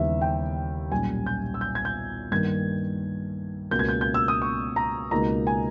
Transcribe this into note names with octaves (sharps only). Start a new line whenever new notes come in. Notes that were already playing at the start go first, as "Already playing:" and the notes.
Already playing: D#2 C#3 E3 G3 B3 E5
G5
B1 A#2 G3 C#4 G#5
G6
E6
G6
G#6
G6
G2 D#3 A#3 G#6
C#2 B2 A#3 C#4 G6
G#6
G6
G6
E6
D#6
C#6
A#5
C#2 B2 A#3 D#4 A#5
G#5